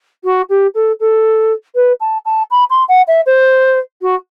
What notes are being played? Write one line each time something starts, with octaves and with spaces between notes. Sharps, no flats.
F#4
G4
A4
A4
B4
A5
A5
B5
C6
F#5
E5
C5
F#4